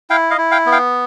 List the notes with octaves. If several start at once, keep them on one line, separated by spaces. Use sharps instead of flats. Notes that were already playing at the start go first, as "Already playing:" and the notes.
E4 F5 G5
D#5 F5
E4
F5 G5
B3
F5 G5